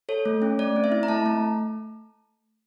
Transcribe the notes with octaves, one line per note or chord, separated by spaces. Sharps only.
A4 C#5
A3
C#4
A3 D5
C4
E5
E4
A#5
A3 A5
A3